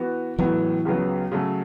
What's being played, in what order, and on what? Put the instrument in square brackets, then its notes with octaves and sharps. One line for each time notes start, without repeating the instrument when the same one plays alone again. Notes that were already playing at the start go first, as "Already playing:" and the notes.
Already playing: [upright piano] E3 B3 F#4
[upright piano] A2 F#3 B3 [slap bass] E3
[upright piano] C#2 C#3 F#3 B3
C#3 F#3 A3